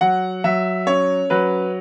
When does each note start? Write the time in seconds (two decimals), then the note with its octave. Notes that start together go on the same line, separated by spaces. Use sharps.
0.01 F#3 F#5
0.44 F#3 E5
0.87 C#4 C#5
1.30 F#3 B4